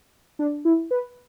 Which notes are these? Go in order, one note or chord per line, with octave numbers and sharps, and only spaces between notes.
D4
E4
B4